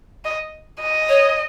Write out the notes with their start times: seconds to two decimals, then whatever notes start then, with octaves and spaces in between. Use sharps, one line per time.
0.25 D#5
0.81 D#5
1.09 C#5